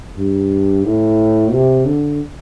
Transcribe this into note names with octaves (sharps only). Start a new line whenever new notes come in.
G2
A2
C3
D3